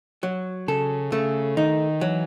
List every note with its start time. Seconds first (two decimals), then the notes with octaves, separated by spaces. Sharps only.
0.23 F#3
0.68 C#3 A4
1.12 C#3 A3
1.57 D#3 D#4
2.01 E3 F#3